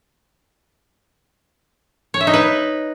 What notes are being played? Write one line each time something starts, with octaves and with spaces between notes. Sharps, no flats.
C#5
E5
D#4
B4